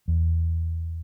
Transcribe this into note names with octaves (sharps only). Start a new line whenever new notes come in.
E2